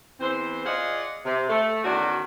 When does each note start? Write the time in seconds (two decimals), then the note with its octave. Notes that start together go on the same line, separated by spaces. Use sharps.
0.20 E2 E3 C4 C5
0.65 F4 G#4 D5 D#5 F5 F#5
1.24 C3
1.49 A3
1.84 E2 D#3 C#4 D4 F#4